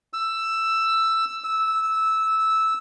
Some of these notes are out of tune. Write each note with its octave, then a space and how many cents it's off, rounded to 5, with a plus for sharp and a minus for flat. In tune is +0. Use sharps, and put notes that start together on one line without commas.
E6 +10
E6 -10